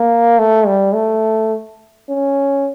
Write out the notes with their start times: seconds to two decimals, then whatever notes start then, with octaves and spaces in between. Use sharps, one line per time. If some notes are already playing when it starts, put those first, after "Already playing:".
Already playing: A#3
0.39 A3
0.66 G3
0.94 A3
2.09 C#4